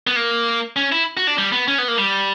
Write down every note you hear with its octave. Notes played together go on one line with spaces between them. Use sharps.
B3
A#3
C#4
E4
F#4
D4
G3
B3
C#4
B3
A#3
G3